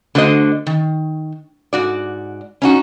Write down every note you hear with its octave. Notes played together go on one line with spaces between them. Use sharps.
D3 A3 F#4 C5 D#5
D#3
G#2 F#4 D5
C#4 D#4 F#4